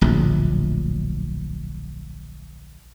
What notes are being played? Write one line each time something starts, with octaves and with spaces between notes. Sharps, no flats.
D1 A#1